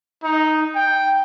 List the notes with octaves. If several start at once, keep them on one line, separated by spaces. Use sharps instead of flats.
D#4
G5